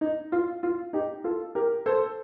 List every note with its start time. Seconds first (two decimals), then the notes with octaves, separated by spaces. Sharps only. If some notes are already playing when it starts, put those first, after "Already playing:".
0.01 D#4
0.32 F4
0.63 F4
0.93 D#4 G4
1.24 F4 A4
1.55 G4 A#4
1.86 A4 C5